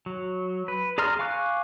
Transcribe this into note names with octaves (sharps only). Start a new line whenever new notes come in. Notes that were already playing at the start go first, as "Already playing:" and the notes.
F#3
B4
G#4 D5 A#5 C6 F6
F5 G#5 C#6 D6 F#6